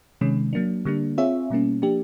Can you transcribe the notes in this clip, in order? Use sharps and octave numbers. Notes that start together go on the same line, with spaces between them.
C3 D#3 G#3 C#4
F#3 A#3 D4
D3 G3 A#3 D4
C4 F4 G#4 C#5 E5
B2 G3 A#3 C#4
F3 A#3 D4 G4